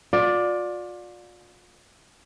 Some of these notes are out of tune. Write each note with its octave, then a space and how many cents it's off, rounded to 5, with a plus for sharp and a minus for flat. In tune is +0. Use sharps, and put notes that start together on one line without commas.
F4 +40 D5 +5